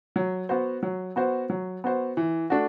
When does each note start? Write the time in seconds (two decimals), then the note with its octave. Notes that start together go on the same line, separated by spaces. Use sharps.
0.16 F#3
0.49 B3 F#4 C5
0.83 F#3
1.16 B3 F#4 C5
1.50 F#3
1.84 B3 F#4 C5
2.17 E3
2.50 A3 D4 F#4